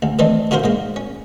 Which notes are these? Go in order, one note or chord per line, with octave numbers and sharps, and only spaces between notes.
D2
D#3 E3 A3 C4 D4 D#4
D3 F4 F#4 A#4 C5
G#2 A#3
C#4